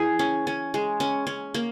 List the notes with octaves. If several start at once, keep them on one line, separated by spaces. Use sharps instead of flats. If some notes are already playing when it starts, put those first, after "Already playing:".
Already playing: E3 G#4
C#4
C#4
G#3
C#4
C#4
A#3